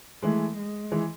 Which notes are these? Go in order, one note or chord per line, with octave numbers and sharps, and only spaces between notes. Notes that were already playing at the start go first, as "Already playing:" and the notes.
E3 G#3 A3
G#3
E3 G#3